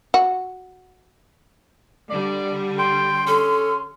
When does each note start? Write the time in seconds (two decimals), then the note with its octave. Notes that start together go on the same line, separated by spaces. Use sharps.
0.14 F#4
2.10 D3 G3 D5
2.79 G5 C6
3.27 C#4 A4